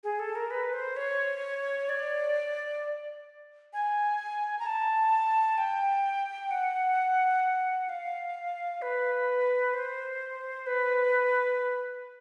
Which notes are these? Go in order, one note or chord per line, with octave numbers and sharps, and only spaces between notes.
G#4
A4
A#4
B4
C5
C#5
D5
G#5
A#5
A5
G5
F#5
F5
B4
C5
B4